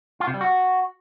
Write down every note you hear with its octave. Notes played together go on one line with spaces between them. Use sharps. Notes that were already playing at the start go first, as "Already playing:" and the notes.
F4
C3
G3
F#4